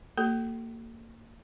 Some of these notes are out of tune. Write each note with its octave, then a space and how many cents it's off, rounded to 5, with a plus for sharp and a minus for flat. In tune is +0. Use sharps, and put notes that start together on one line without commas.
A#3 -30 F#4 +40 A4 +0